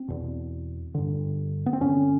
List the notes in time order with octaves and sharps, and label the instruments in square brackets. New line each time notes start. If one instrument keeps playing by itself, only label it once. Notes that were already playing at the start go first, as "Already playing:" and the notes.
Already playing: [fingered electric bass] C4
E2 B2
G2 D3
B3
C4
G2 D3 C#4